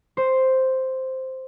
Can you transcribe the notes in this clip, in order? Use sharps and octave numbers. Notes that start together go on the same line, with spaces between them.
C5